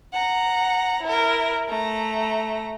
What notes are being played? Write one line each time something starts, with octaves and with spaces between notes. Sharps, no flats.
F#5 A#5
E4 A#4
A3 A#5